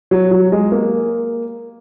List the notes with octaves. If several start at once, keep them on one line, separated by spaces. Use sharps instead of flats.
F#3
F#3
G#3
A#3